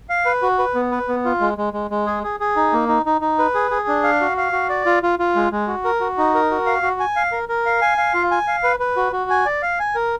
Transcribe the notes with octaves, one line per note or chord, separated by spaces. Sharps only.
F5
B4
F#4
B4
B3
B4
B3
F4
G#3
G#3
G#3
G#3
G#4
G#4
G#4
D#4
A#3
D#4
D#4
D#4
B4
G#4
G#4
D4
F5
F#4
F5
F#4
D5
F4
F4
F4
G#3
G#3
F#4
A#4
F#4
D#4
A#4
F#4
F5
F#4
G#5
F5
A#4
A#4
F5
G#5
F5
F4
G#5
F5
B4
B4
F#4
F#4
G#5
D5
F5
G#5
A#4